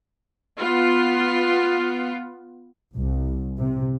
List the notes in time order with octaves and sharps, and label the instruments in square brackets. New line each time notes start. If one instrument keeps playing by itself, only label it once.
[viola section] B3 F4
[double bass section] C2
C3